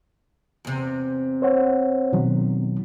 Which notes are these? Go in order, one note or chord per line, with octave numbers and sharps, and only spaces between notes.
E2 C3
C5 C#5 F#5
B2 D#3 F#3